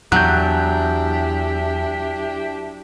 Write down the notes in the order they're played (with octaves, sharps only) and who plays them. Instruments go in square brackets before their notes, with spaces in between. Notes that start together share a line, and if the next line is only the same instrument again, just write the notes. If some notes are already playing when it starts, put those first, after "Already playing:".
[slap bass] E2 [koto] F#3 [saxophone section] D4 E4 G4 [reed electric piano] F#6 G6